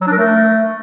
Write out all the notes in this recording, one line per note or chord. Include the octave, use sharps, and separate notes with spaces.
F#3
D4
A#4
A3